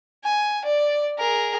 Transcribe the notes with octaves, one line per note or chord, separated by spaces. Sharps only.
G#5
D5
G#4 A#4